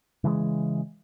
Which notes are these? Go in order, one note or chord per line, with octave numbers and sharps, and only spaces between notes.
C#3 E3 F#3 G#3